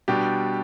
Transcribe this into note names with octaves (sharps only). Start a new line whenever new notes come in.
B2 G3 D4 G4